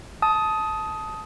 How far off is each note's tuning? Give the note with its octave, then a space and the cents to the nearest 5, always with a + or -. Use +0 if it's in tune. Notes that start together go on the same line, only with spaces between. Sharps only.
A5 -10 D#6 +15